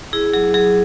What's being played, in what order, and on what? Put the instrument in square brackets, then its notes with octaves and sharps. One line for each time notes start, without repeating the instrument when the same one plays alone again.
[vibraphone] E4 G#4
F#3 G#4
F#3 G#4